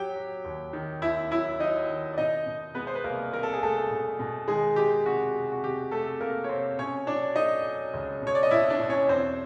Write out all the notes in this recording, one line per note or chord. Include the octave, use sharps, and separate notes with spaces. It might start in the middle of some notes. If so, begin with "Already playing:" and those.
Already playing: F#3 G4 G5
F#3
D#2
D#3
D#2 E4 E5
F#3 E4 E5
F#3 D#4 D#5
D#3
D5
B2 D#4 D#5
B2
G#3 B3 B4
C5
B4
C2 A#3 A#4
C4 A#4
A4
G#4
C2 A3 A4
B2
B2
D#3 G#3 G#4
G#3 G4
C3 F#4
C3
F#4
C3 G4
C3 A3 A4
C3 A#3 A#4
C#5
C3 C4 C5
B2 C#4 C#5
F#3 D4 D5
A3 D#4 D#5
F#3
C#2
B2
C#5
D5
D#5
B2 E4 E5
D4 D5
B2
C#4 C#5
E2 C4 C5